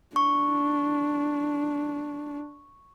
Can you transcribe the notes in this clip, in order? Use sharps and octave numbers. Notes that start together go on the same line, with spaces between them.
D4 C#6